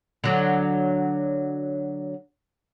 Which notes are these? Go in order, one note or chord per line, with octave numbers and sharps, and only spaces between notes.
D3 F#3